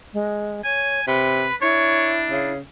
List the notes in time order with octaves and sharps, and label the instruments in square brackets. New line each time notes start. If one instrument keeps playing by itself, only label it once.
[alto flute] G#3
[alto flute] C#5 [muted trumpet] G#5
[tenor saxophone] C3 [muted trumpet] B4 [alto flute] B5
[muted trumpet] D4 [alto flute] E4 [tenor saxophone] C#5
[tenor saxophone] C#3